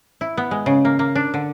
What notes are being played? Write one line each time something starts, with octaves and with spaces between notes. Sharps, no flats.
E4
B3
G#3
C#3
A#3
A#3
D4
D3